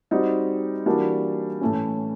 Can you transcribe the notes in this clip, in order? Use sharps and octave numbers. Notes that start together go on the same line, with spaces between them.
G3 C4 D#4 F#4
E3 G3 A#3 D4 F#4
A2 E3 A3 C#4